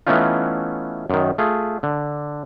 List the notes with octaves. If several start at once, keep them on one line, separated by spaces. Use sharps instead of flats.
E3 A3 B3 C#4 D#4 F4
F#2 D#3
A3 F4 G#4
D3